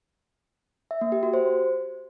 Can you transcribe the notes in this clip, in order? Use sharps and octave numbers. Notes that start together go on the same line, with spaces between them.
E5
A#3
G4
F#4
C5